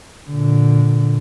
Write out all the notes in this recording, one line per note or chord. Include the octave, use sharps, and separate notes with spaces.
A#2 D3